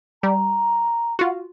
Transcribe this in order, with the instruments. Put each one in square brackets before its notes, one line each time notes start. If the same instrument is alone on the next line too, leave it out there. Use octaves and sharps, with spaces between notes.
[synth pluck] G3 [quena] A#5
[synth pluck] F4 F#4